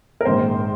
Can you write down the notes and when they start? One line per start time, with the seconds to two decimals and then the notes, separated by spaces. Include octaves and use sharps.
0.21 A#4
0.25 A#1 G#2 D#3 G#3 C5